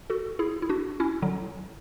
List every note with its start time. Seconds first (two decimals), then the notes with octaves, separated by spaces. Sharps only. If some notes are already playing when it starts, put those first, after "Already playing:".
0.10 F#4 A4
0.39 E4 G#4
0.62 E4
0.69 D4 F#4
1.00 C#4 E4
1.22 D3 F#3